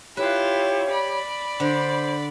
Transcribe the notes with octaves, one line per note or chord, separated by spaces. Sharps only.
E4 F4 G4 B4 C#5
D5 B5
D3 C5